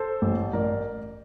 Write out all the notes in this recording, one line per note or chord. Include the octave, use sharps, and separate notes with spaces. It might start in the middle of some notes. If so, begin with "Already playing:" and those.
Already playing: A4 C5
A1
A1 A#4 D5